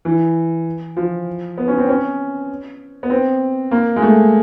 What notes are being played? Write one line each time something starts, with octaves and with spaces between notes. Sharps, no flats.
E3
F3
B3
C#4
C4
C#4
B3
C4
A#3
G#3
A3